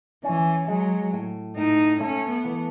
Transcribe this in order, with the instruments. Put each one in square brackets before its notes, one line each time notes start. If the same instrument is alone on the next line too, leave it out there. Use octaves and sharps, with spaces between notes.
[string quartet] E3 [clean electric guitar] C#4
[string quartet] F#3 [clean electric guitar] G#3
[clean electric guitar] A2
[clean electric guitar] A2 [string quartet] D#4
[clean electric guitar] A3 [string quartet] C#4
[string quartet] B3
[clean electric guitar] E3